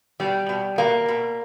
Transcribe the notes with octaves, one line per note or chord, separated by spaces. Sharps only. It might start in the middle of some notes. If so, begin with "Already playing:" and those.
B2 G3
B2
B2 A#3
B2